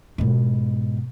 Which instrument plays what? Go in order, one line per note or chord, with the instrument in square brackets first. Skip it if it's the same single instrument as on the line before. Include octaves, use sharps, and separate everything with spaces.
[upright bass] G#2 B2